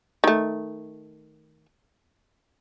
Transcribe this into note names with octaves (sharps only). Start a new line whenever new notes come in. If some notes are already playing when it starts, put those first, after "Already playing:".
D#3 A3